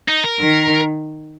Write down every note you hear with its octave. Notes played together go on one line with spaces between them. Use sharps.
D#4
A#4
D#3